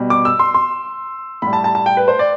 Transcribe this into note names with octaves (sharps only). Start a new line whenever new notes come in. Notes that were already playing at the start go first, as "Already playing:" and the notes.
Already playing: B2 G3
D6
E6
C6
C6
A2 G3 B5
A5
A5
A5
G5
B4
C5
D5